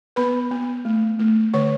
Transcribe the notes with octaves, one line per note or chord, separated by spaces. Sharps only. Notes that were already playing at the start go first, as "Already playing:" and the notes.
B3 B4 B5
B3
A3
A3
D3 C#5 C#6